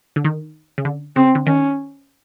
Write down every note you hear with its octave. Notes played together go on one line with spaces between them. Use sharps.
D3
D#3
C#3
D3
C#3 C4
D3
D#3 C#4